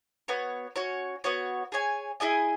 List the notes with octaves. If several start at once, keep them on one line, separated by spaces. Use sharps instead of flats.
B3 F#4 C#5
C#4 F#4 C#5
B3 F#4 C#5
G#4 C#5 G#5
E4 G#4 D#5 G#5